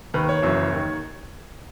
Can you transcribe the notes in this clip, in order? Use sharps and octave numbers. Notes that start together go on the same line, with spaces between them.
D#2 D#3 B4
C#5
F#1 F#2 E3
D#2 D#3